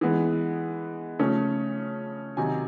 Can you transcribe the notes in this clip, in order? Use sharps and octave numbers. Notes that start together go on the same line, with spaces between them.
E3 G#3 B3
C#3 F3 A3 C#4
C3 D#3 F#3 G#5